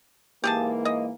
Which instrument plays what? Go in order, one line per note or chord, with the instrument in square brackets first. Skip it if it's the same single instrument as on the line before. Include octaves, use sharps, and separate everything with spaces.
[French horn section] G#2 E3 A#3 [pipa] G4 G#4 A5
[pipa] D#5